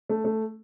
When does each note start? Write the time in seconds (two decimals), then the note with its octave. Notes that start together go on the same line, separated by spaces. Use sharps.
0.09 A3
0.24 A3